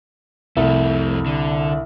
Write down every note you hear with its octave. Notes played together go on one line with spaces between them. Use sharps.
C2 F2 A3
D3